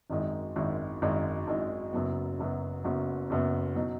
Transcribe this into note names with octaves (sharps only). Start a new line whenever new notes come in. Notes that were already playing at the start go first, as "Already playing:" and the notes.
G#1 F#2 D#3 G#3 D#4
G#1 F#2 D#3 G#3 D#4
G#1 F#2 D#3 G#3 D#4
G#1 F#2 D#3 G#3 D#4
F#1 F#2 F#3 B3
F#1 F#2 F#3 B3
F#1 F#2 F#3 B3
F#1 F#2 F#3 B3
B2 F#3 D#4